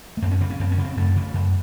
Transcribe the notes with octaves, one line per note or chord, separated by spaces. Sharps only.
A3
F#2 C4
C#4
C#3 C4
C#4
F#2 C4
C#4
C#3
C4
F#2 A3
C#3
F#2